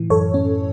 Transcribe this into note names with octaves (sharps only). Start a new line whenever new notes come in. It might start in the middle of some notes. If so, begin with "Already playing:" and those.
Already playing: A2 E3
F#2 A4 C#5
C#4